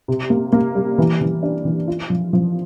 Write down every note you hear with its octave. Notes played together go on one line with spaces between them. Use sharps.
C3
A#3
A#3
G3
E3
E3
D4
E3
F4
F3
F3